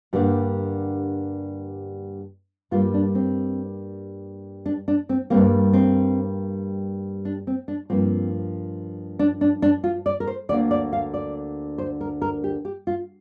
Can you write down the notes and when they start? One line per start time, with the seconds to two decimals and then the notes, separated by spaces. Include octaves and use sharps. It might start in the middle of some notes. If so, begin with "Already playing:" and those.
0.13 G2 D3 G3 A#3 G4
2.71 G2 G3 A#3 F4
2.94 D4
3.15 C4
4.66 D4
4.88 D4
5.09 C4
5.30 G2 G3 A#3 C4
5.73 C4
7.25 D4
7.47 C4
7.68 D4
7.90 G2 F3 A#3 C4
9.19 D4
9.41 D4
9.62 D4
9.84 F4
10.06 D5
10.20 A#4
10.27 C5
10.49 D2 D3 A#3 D5
10.71 D5
10.93 F5
11.14 D5
11.78 C5
12.01 A#4
12.22 A#4
12.44 G4
12.65 G4
12.87 F4